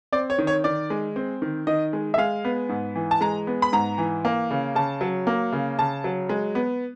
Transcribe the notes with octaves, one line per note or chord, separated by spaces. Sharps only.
C4 D5
C#5
D#3
C#5
D#3 D5
G#3
C4
D#3
D#3 D#5
G#3
E5
G#3 F5
B3
G#2
E3
A5
G#3 A#5
B3
B5
G#2 A#5
E3
A#3
C#3
C#3 A5
F#3
A#3
C#3
C#3 A5
F#3
G#3
B3